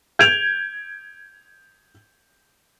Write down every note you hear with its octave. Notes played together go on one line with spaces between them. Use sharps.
G6 G#6 D7 F7